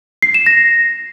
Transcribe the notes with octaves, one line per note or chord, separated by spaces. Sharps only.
C7
E7
A#6